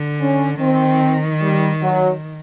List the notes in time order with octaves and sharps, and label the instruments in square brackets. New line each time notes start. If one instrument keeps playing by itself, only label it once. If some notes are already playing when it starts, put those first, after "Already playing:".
Already playing: [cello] D3
[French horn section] C#4
[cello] D#3 [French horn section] C4
[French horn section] G3
F#3